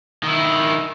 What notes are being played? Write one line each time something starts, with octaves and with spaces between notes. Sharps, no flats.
D#3 E4